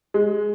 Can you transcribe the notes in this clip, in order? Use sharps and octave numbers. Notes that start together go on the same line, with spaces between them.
G#3